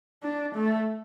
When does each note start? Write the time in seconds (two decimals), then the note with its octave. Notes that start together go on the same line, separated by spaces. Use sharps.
0.23 D4
0.55 A3